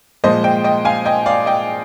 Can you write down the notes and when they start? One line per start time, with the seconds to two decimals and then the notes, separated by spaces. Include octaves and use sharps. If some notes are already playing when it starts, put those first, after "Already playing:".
0.24 A#2 F3 G#3 C5 D#5
0.44 D#5 G5
0.64 D#5 G5
0.85 F5 G#5
1.05 D#5 G5
1.26 D5 F5
1.46 D#5 G5